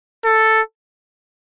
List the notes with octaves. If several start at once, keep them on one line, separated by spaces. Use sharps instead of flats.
A4